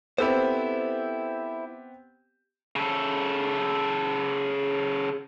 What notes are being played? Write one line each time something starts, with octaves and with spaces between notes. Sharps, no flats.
B3 C4 E4 G4 A4 C5
C#3 A4